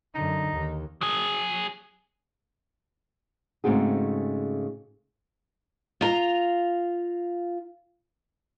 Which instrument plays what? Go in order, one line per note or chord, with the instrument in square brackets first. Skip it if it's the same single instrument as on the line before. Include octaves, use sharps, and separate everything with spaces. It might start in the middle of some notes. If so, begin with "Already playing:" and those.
[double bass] F#2 D3 [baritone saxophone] D#4
[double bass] D#2
[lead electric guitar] F#3 G#4
[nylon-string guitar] G#2 C#3 A3 C4 F#4 G#4
[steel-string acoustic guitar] F4 A#5